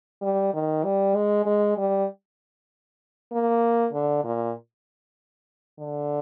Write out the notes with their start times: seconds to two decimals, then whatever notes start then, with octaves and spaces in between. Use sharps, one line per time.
0.22 G3
0.53 D#3
0.84 G3
1.15 G#3
1.46 G#3
1.77 G3
3.32 A#3
3.93 D3
4.24 A#2
5.79 D3